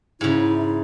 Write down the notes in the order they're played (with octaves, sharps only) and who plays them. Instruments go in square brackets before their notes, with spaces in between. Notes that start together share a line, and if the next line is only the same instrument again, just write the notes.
[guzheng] G#2 C#3 [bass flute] E4